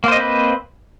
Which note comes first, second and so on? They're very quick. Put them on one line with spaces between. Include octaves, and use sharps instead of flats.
A#3 C5 D#5 C4 B4